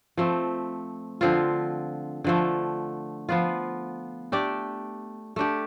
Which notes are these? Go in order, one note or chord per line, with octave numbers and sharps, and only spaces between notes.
F3 A3 C4
D3 F3 C4 F4
D3 F3 A3
F3 B3 F4
A3 D4 G4 D5
A3 D4 G4